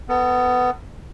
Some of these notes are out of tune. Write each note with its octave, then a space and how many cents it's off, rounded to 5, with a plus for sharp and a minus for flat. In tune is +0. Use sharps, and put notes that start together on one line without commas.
B3 +15 A4 +45